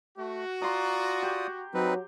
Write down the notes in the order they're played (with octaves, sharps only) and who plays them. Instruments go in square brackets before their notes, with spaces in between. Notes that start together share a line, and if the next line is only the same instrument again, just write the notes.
[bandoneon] A3 [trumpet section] F#4
[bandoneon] F4 D5 D#6 [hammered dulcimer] A#5 C6
[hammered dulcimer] G4
[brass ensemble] F#3 [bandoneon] C4 D#4 B4